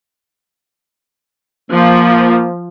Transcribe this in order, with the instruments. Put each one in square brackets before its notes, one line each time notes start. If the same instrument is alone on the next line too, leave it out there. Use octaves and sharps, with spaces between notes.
[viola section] F3 [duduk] A#3